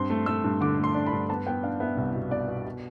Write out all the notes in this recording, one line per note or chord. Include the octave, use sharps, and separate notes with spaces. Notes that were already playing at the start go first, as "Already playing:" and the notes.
Already playing: G2 C4 C6
A3
A3 E6
G2
D3 D6
A3
C6
D4
B5
G2
B3 A5
B3 G5
D4 F5
B3 E5
C2 E5
B2
B3 D5
B2
B2